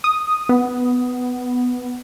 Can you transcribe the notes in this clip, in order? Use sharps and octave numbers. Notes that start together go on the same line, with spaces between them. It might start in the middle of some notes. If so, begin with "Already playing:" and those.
D#6
B3